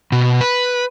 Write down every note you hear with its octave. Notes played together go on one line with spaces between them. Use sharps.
B2
B4